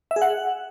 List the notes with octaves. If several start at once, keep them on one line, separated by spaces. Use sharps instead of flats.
E5
G#4
F#5